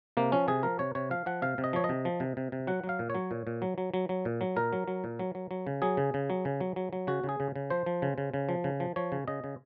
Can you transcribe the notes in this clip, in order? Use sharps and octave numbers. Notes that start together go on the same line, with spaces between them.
C3 A#3
F3 C#4
C3 G#4
F3 A#4
C3 C#5
C3 C#5
F3 F5
F3 F#5
C3 F5
C3
D#5
F3 C#5
D#5
C3
F3
C3
C3
C3
F#3 F#5
F#3
F5
A#2
F#3 C#5
A#2
A#2
F#3
F#3
F#3
F#3
A#2
F#3
A#2 A#4
F#3
F#3
A#2
F#3
F#3
F#3
C#3
F#3 G#4
C#3
C#3
F#3
C#3
F#3
F#3
F#3
C#3 F#4
C#3
G#4
C#3
C#3
F3 C5
F3
C#3
C#3
C#3
F3
C#3
F3
F3 C#5
C#3
C#3 D#5
C#3